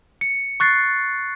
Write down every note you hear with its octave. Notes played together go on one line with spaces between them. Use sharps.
C#7
C#6 F#6 A6 C7